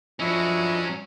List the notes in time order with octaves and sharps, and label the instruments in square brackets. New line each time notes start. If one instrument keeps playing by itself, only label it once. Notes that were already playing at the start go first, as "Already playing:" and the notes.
[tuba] F3 [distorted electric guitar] F#3 C#4 [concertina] D4 A4 C#5 [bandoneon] E4 D#5